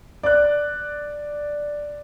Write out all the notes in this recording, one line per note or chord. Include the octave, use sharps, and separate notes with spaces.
D5 F#6